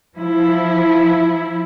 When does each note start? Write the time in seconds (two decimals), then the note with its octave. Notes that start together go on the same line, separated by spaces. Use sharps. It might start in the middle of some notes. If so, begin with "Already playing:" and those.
0.17 F3 E4